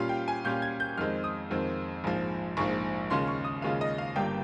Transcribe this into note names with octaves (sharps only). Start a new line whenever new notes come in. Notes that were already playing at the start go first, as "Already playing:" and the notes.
Already playing: A#2 G3 C#4 F4 F5
G5
G#5
A#2 G3 C#4 F4 G6
G#6
G6
F2 D#3 G#3 C4 F6
D#6
F2 D#3 G#3 C4
A#1 G#2 F3
A#1 G#2 F3 C#6
D#2 C#3 G#3 C#4 F4 C6
C#6
D#6
D#2 C#3 G#3 C#4 F4 F5
D#5
F5
G1 G2 G3 A#3 G5